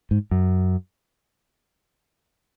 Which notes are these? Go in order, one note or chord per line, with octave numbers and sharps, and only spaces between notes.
G#2
F#2